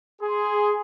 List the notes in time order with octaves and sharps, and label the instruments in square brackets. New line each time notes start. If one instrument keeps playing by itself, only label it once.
[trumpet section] G#4 C6